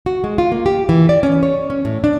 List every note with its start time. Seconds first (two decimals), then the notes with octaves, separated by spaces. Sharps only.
0.06 F#4
0.24 G#3
0.38 F4
0.52 A#3
0.66 G4
0.89 E3
1.09 D5
1.23 C#4
1.43 C#5
1.70 C#4
1.85 A2
2.04 D4